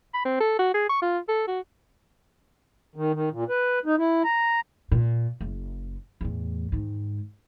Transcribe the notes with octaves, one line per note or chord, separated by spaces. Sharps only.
B5
C4
A4
F#4
G#4
C#6
F4
A4
F#4
D#3
D#3
A#2
B4
D#4
E4
A#5
A#2
F#1
E2 A2
G#2 D#3